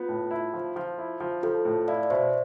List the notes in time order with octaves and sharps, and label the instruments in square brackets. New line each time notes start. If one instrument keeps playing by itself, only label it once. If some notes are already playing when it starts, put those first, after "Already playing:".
Already playing: [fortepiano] B3 [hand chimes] F4
[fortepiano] A2
E4
F3
F3
E4
F3
[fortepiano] F3 [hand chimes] F4 A4
[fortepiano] A2
[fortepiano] E4 [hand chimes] D5 F5
[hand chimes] D5
[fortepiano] B2 [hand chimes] C5 E5